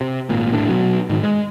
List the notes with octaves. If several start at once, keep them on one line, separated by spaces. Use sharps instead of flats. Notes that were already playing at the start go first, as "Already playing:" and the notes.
C3
G#1 A#2
D#1 G#1 A2 D4
B2 F#3
G#2 D#3
G#3